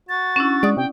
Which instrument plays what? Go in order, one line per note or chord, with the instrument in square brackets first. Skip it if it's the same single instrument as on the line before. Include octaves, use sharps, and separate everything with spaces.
[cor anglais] F#4 [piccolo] A6
[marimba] C#4 D4 E4
[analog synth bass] G#3 [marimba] D5 F#5 D#6
[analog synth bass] C3 [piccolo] G5